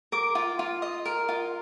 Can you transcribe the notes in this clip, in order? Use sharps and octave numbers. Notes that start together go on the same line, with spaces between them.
A#4 D6
F4
F4
D#5
A#4
F4